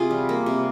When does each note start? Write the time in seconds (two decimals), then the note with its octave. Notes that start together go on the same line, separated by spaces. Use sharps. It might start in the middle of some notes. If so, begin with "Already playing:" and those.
Already playing: C3 F4 G#4
0.11 G3
0.29 A#3
0.46 C3